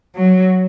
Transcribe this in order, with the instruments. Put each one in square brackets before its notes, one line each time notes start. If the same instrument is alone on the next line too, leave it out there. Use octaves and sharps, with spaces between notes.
[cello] F#3